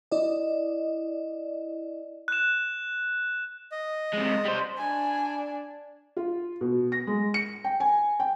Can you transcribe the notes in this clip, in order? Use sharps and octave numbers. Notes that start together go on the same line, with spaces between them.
E4 D5 D#5
F#6 E7
D#5
C3 G#3
G3 C5
D4 G#5
F4
B2
A#6
G#3
C#7
G5
G#5
G5